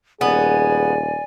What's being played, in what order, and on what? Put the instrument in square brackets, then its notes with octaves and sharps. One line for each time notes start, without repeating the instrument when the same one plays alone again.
[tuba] D#1 [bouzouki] B3 [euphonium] G#4 [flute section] D5 G#5